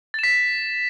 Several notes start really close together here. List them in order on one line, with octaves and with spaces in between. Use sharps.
A6 E7 B6